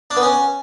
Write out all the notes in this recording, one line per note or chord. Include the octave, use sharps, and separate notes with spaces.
D4
B3
C#4